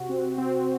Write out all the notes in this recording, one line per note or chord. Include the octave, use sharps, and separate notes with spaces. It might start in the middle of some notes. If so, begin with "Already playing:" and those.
Already playing: C3 F#4
C4
C4